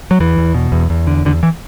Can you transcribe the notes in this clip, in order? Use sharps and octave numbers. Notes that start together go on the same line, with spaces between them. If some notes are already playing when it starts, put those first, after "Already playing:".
F#3
E2 E3
E2
B2
E2
E2
D3
E2 D3
E3